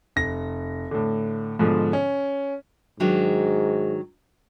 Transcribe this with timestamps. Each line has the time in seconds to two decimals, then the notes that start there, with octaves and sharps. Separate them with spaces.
0.16 F1 A#6
0.91 A2 D3
1.59 G#2 B2 D3 F3
1.93 C#4
3.00 G#2 D#3 F#3 D4